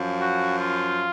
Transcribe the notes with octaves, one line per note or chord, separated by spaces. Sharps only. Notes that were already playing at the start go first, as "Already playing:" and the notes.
Already playing: F#2 F3
F#4
F4